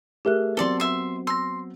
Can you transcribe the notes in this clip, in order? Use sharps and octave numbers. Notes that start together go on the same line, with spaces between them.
A3 G4 G#4 A#4 E5 F#6
F#3 B3 C4 A4 D5 C6 G7
E5 C6
C6 E6 A#6